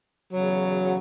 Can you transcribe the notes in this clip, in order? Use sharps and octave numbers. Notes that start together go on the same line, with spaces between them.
E2 C#3 F#3